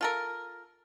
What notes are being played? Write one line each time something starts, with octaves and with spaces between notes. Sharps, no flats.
F4 A4 A#4